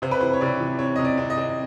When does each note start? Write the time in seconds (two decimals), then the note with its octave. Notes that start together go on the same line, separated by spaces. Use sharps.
0.02 C3 C5
0.11 B4
0.20 E3 C5
0.33 C#5
0.41 C3 D5
0.60 E3
0.79 C4 C#5
0.96 C3 D#5
1.05 D5
1.17 C4
1.30 D#5
1.37 C4